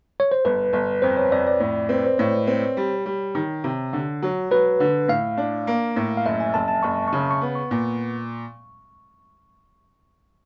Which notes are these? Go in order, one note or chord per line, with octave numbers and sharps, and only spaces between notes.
C#5
C5
G1 B4
G1
F2 C5
C#5
F2 D5
D5
A2
C4 B4
C5
A2 C#5
C4
G3
G3
D#3
C3
D3
F#3
F#3 B4
D3
A2 F5
D4
A#3
A2
F5
F#1 E5
G#5
F#1 A5
A5
F#1 C#6
C#3 C#6
C#6
B3
C#6
A#2